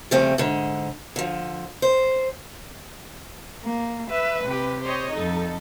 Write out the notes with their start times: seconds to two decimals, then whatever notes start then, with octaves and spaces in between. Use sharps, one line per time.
0.11 C#3 F3 G3 A3 C4
0.38 G#2 D3
1.16 D3 F3
1.82 C5
3.64 A#3
4.10 B4 E5
4.44 C3 G4
4.84 C5 C#5 D#5
5.16 F2 D#4 A4